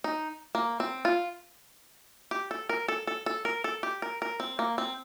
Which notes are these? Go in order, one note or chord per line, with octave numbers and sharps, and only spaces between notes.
D#4
A#3
C4
F4
G4
A4
A#4
A4
A4
A4
A#4
A4
G4
A#4
A#4
C4
A#3
C4